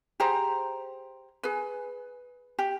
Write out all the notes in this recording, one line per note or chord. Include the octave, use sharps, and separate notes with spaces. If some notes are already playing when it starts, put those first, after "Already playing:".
G4 G#4 C5 A#5
G#4 B4
G4